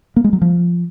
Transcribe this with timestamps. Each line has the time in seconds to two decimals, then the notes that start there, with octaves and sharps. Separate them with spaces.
0.16 A#3
0.24 G#3
0.33 F#3
0.42 F3